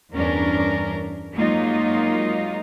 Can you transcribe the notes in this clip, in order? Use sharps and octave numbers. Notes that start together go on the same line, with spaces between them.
E2 G2 C#4 D4 A#4
F#3 G#3 A#3 D#4 F4